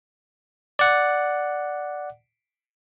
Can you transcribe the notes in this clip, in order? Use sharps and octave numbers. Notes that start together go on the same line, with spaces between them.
D5 F#5